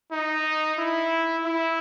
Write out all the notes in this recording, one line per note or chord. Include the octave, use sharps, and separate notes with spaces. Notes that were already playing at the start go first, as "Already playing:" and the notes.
D#4
E4
E4